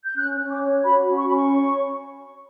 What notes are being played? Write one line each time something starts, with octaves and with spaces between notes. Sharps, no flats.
G6
C#4 F#6
C#4
D6
C#5
F#4 B5
C#4
C#6
C#4 B5
C#6
C#5